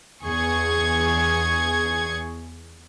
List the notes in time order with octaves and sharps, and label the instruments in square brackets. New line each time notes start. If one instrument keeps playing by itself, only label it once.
[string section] E2 G#4 C#6 G#6